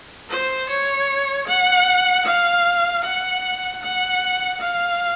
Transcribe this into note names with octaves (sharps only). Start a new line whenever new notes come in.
C5
C#5
F#5
F5
F#5
F#5
F5